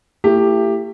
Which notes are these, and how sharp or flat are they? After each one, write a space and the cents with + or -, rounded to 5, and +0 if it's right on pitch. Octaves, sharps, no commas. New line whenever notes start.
A3 +40 E4 +35 G4 +10